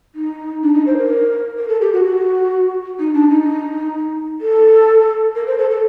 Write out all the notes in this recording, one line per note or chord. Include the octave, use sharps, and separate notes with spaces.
D#4
D4
D#4
C5
A#4
A#4
A4
G4
F#4
F#4
D#4
D4
D#4
A4
A#4
C5
A4
A4